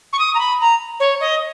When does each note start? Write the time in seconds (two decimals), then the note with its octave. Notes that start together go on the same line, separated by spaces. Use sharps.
0.12 C#6
0.18 D#6
0.34 A#5
0.39 B5
0.60 A#5
0.99 C#5
1.20 D#5